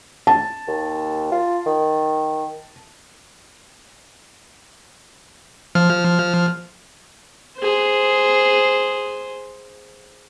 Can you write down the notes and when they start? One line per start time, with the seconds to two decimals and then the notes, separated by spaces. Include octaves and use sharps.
0.27 A5
0.68 D#2
1.32 F4
1.66 D#3
5.75 F3 F6
7.58 G#4 C5